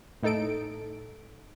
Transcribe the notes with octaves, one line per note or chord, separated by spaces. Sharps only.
A2 D#4 A4 D7